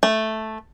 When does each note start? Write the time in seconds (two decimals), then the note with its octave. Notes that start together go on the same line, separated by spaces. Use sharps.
0.03 A3